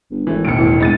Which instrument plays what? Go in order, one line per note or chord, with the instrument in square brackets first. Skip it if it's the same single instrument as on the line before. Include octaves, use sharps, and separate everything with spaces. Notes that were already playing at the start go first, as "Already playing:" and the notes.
[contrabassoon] G1
[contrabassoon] G#1 [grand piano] E3 A3
[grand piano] E1 A1 D#2 [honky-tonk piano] C#7 D7
[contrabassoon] G#1 [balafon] E4
[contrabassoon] G1 [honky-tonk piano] G#3 A6 D#7